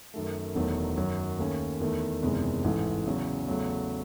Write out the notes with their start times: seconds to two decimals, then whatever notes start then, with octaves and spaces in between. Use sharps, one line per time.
0.14 F#2 D#3 A3
0.55 E1 E2 D#3 F#3 A3
0.97 F#2 D#3 F#3
1.39 D#2 D#3 A3 C#4
1.80 E2 D#3 A3
2.23 F#1 E2 C3 D#3 G#3
2.64 A1 G#2 E3 A3
3.06 E2 C#3 F#3 C#4
3.47 E2 C#3 F#3 A3